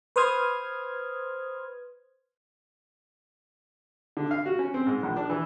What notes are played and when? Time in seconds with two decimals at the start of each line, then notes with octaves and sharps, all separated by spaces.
0.16 B4 C5 C6 D#6 F6 G#6
4.17 D3
4.31 F5
4.46 F#4
4.59 C#4
4.74 C4
4.87 G#2
5.03 A#1
5.17 D4
5.30 E3